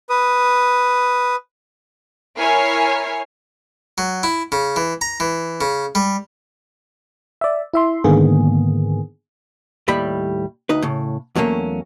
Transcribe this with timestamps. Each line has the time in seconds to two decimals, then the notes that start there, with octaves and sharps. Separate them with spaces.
0.10 B4 D#6
2.38 E4 A#4 C#5 G#5 F6 C7
3.98 F#3
4.23 E4
4.52 C#3
4.76 E3
5.01 A#5
5.20 E3
5.61 C#3
5.95 G3
7.41 D5 E5
7.73 E4 E5 C6
8.04 G#2 D3 D#3 A#3 B3 G#4
9.88 D#2 A2 G3 G5 B5
10.69 D2 D#4 B4
10.82 A2 C#3
11.35 E2 F#3 A3 A#3 C#4